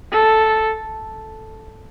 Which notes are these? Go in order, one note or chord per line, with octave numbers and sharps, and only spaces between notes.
A4